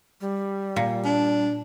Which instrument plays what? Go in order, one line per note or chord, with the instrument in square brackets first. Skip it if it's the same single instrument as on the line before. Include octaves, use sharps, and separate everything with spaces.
[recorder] G3
[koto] A#2
[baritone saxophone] D4